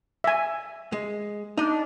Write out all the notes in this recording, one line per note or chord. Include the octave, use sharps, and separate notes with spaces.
E5 G#5
G#3
D4 D#4 D#5